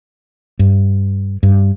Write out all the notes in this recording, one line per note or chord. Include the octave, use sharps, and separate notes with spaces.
G2
G2